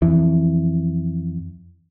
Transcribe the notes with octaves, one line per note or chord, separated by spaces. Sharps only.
F2 E3